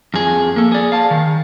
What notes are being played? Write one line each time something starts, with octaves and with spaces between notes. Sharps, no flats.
F2 G#4
A#3 A4
G#4 D5
F5 A5
D#3